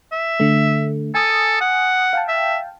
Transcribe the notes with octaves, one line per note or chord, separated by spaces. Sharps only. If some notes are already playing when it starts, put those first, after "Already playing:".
E5
D3 A3
A4 G#5 D#6
F#5
F5 G5 A5
E5